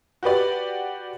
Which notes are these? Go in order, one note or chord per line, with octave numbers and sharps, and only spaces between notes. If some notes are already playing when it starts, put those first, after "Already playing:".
F#4 G4 B4 D5